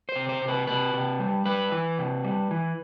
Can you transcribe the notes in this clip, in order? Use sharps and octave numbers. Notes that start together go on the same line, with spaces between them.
C5
C3
C5
C3
B4
C3 B4
C3
G3
G3 B4
E3
C3
G3
E3